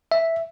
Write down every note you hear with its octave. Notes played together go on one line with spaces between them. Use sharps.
E5